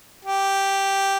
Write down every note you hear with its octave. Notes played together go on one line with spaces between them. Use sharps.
G4